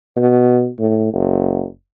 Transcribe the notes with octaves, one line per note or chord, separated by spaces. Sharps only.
B2
A2
F#1